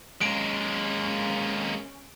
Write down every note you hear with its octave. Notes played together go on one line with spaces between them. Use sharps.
G#3 A#3 C#4 D7